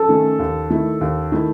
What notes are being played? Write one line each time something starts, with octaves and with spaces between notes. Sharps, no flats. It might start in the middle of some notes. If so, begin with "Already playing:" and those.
Already playing: A4
D#3 A3 C#4
D#2
D#3 A3 E4
D#2
D#3 A3 E4